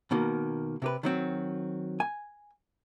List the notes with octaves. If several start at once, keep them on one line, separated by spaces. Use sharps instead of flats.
B2 D#3 A#3
C3 G4 B4
D#3 F#3 C4
G#5